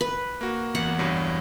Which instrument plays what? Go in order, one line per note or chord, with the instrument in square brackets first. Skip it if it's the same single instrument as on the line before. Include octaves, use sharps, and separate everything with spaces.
[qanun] B4
[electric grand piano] A#3 F#4
[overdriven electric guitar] E2 [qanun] F#5
[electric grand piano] C2 G2 F#3